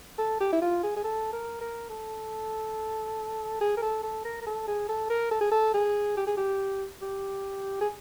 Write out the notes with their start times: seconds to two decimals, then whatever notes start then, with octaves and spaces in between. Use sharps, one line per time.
0.18 A4
0.40 G4
0.52 E4
0.62 F4
0.83 G#4
0.96 G#4
1.04 A4
1.33 A#4
1.61 A#4
1.90 A4
3.61 G#4
3.77 A#4
3.82 A4
4.03 A4
4.25 A#4
4.41 A#4
4.47 A4
4.68 G#4
4.89 A4
5.10 A#4
5.31 A4
5.41 G#4
5.52 A4
5.74 G#4
6.17 G4
6.27 G#4
6.37 G4
7.02 G4
7.81 G#4